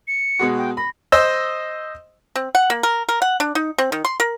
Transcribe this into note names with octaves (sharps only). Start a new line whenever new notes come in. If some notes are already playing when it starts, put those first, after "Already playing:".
C#7
B2 G#3 F#4
G5
B5 A#6
C5 D#5 E6
C4
F#5
A#3
A#4
A#4
F#5
D4
D#4
C4
D#3
C6
A#4